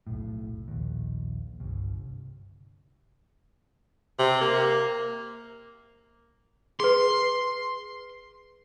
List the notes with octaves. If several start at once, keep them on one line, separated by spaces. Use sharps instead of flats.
F1 B1 A2
A#1 D#2
G1 C2
C3
A#3
G#4 B4 C6